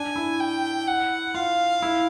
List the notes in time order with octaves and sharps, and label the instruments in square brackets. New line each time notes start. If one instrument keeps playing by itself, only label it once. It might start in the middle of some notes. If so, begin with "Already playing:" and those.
Already playing: [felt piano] D4 [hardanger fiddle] G#5
[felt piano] E4
[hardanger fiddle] G5
F#5
[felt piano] F4 [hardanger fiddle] F5
[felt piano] E4